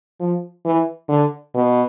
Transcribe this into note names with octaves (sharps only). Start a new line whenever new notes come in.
F3
E3
D3
B2